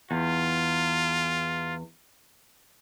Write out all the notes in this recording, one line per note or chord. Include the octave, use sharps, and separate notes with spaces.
E2 F4